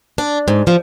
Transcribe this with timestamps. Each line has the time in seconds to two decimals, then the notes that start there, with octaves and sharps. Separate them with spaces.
0.18 D4
0.48 G#2
0.67 F3